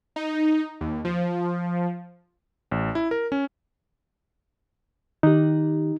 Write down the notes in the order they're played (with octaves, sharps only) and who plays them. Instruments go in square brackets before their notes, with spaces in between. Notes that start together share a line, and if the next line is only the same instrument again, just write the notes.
[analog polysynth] D#4
D#2
F3
[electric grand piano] A1
E4
A#4
C#4
[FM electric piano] D#3 G4 [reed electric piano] D#4